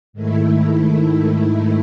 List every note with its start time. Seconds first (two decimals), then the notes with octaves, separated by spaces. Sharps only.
0.13 G#2 D#3 A3 E4